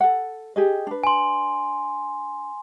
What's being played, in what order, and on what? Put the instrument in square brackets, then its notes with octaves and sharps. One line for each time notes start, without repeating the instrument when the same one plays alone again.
[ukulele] A4 F#5
G4 G#4 D#5
D4 B4
[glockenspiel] G#5 C6